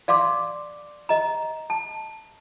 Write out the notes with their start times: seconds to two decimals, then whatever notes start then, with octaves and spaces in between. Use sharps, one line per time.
0.08 D5 F5 C6 D6
1.09 D#5 A#5
1.70 A5